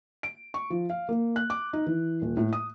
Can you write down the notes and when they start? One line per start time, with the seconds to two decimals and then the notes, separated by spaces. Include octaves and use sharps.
0.23 D7
0.54 C#6
0.70 F3
0.90 F5
1.09 A#3
1.36 F#6
1.50 D6
1.73 D#4
1.87 E3
2.22 D#1
2.37 A2
2.53 D#6